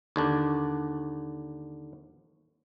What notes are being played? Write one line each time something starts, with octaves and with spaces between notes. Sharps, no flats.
D#2 D3 D4